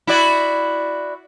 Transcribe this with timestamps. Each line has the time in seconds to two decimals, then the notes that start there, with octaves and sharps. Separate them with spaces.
0.07 E4 F#4 D5